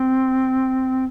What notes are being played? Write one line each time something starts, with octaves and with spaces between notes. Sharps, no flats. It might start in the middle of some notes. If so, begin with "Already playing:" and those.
Already playing: C4